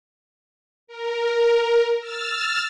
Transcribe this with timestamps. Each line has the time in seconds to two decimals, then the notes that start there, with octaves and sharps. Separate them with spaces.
0.87 A#4
1.99 E6 F6 A6